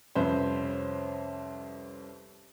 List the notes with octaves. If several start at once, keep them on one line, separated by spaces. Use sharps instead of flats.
C2 F2 C#4 B4 C5